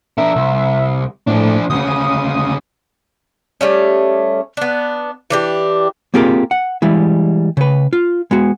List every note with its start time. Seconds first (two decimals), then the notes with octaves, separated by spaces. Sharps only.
0.18 D4 A#4 E5
0.36 C2
1.27 A2 F3 D4
1.70 D2 C#3 D#6
3.61 G3 A3 C#4
4.57 B3 D4
5.30 E3 D4 G4
6.14 A#3 C4 F4 G4 G#4 A#4
6.51 F#5
6.82 E3 G3 G#3 E4
7.57 C#3 B4
7.93 F4
8.31 G#3 B3 F#4